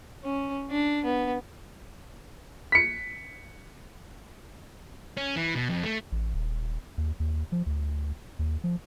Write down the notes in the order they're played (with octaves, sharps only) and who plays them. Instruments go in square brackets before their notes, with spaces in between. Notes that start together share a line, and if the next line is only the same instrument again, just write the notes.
[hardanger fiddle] C#4
D4
B3
[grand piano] B6 C#7
[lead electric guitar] C#4
E3
B2
F2
A3
[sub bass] A1
D#1
D#2
D#2
F3
D2
D#2
F3